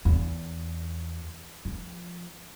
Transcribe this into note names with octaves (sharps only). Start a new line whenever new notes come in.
E2
F3